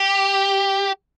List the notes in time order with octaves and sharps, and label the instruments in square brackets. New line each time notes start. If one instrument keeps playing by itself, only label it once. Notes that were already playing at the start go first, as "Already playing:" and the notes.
Already playing: [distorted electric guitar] G4